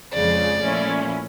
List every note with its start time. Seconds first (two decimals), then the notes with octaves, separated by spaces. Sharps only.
0.12 F2 C#3 F3 G#3 D5
0.61 A#2 F3 A3 C#4 E4